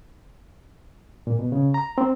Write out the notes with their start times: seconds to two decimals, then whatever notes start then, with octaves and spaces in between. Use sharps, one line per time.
1.27 A#2
1.39 B2
1.52 C#3
1.74 A#5
1.98 C4